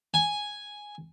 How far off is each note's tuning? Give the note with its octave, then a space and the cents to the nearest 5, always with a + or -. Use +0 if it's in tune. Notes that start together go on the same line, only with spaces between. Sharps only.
G#5 +0